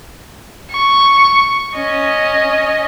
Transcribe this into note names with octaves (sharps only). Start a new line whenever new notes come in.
C#6
C#4 D#5